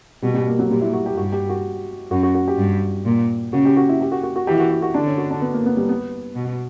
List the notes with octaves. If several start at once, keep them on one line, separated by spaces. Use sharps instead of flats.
B2 G3
G3
A#3
F#3
A#2 G3
E4
F#4
G4
G2 F#4
G4
F#4
F#2 F#4
F#4
F#4
G4
G2
A#2
C#3 F#4
G4
F#4
E4
G4
F#4
F#4
F#4
E3 G4
E4
F#4
F#4
F#4
D3 D4
C#4
F#4
D4
B3
A#3
B3
G3
B3
B2